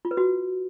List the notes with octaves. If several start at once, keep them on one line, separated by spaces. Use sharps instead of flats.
F4
B4
F#4